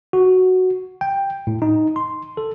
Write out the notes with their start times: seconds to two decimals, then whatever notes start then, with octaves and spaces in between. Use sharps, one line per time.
0.13 F#4
1.01 G5
1.47 A2
1.62 D#4
1.96 C6
2.37 A4